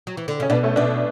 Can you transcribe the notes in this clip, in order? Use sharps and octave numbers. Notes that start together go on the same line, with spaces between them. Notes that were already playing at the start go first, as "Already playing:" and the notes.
F#3
E3
D3
C#3 C#4
B2 B3 D4
A3 C#4
B2 B3 D4